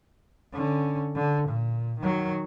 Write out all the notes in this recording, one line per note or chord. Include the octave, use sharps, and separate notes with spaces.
D3 C#4
D3
A#2
D#3 F#3